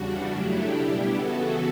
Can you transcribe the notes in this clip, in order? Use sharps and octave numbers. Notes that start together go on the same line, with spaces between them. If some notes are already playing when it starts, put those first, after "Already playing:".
Already playing: E2 C#3 G3 D4 F#4
F#2 C#3 F#3 A3 D4 E4 G4
B2 G3 D4
C#3 E3 B3 F#4 A4